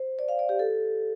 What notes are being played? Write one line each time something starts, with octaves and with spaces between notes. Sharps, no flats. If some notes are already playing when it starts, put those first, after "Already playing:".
Already playing: C5
D5
F5
D5
G4
A4